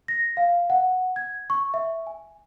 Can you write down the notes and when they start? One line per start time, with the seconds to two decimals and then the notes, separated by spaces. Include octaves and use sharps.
0.08 A#6
0.37 F5
0.70 F#5
1.16 G#6
1.50 C#6
1.74 E5
2.07 G#5